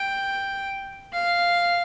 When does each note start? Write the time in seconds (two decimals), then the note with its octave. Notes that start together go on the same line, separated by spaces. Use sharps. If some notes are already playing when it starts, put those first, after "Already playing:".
Already playing: G5
1.12 F5